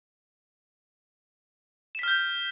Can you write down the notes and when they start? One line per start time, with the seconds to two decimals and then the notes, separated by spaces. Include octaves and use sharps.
1.95 E7
1.99 B6
2.03 F6
2.08 G6